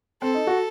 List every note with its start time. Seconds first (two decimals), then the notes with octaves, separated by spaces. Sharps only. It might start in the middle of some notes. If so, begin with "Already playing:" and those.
0.22 C4 A4
0.34 D#4
0.47 F#4